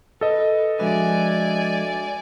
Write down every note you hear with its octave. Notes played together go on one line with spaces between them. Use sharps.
A4 B4 D#5
F3 G#3 D4 F#4 B4 D5 E5 G#5